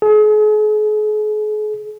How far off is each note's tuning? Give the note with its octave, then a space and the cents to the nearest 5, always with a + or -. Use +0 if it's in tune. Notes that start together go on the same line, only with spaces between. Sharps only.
G#4 +40